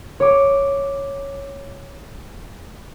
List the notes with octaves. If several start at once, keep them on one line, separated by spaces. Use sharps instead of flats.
C#5 D6